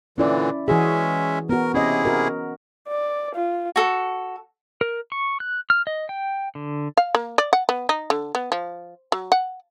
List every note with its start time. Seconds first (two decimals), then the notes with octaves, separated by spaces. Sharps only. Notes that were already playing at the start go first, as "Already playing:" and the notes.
0.18 A#2 D3 E3 C#4 E4 D5
0.68 E3 G#3 C#4 F#4 G#4 E5
1.49 B3 F#4 A#4
1.74 C3 C#4 E4 G#4 D#5
2.05 F#4 A#4
2.88 D5
3.35 F4
3.76 F#4 A4
4.81 A#4
5.12 C#6
5.40 F#6
5.70 F6
5.87 D#5
6.09 G5
6.55 D3
6.97 F5
7.15 A#3
7.38 D5
7.53 F#5
7.69 B3
7.89 D#4
8.10 D3
8.35 B3
8.52 F3
9.12 F#3
9.32 F#5